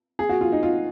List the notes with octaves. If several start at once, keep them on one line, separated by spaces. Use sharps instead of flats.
G#4
F#4
F4
D#4
F4